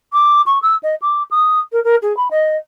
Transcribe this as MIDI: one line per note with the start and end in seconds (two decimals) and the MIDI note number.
0.13 0.42 86
0.46 0.61 85
0.62 0.76 88
0.83 0.95 75
1.02 1.23 86
1.31 1.60 87
1.72 1.80 70
1.84 1.96 70
2.02 2.15 68
2.17 2.28 83
2.31 2.57 75